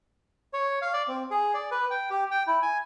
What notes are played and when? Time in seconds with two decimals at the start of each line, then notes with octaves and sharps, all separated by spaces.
0.53 C#5
0.82 F5
0.93 D5
1.08 C4
1.31 G#4
1.54 D5
1.71 B4
1.90 G5
2.10 G4
2.31 G5
2.47 E4
2.62 G#5